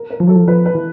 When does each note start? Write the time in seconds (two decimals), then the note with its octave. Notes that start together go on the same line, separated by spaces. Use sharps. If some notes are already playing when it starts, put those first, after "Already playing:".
Already playing: A#4
0.10 A#4
0.20 F3
0.27 F#3 A4
0.36 F3
0.47 F3 B4
0.66 B4
0.75 E3